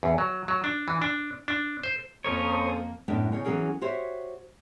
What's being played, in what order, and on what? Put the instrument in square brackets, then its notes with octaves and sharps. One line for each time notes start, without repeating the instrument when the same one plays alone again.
[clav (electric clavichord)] E2
F#3
F#3
D4
E3
D4
D4
C5
[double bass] F2 A#3 [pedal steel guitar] C#4 A#4 C#5 [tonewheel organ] A4 C5 D#6
[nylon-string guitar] F#2 A2 B3 D4
C#3 D#4 C#5
E3 F#3 C#4 G#4 A#4
F#4 G4 C5 C#5 E5